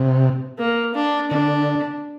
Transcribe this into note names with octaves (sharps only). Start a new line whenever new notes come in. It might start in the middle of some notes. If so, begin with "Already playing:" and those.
Already playing: C3
A#3
D4
D3 D4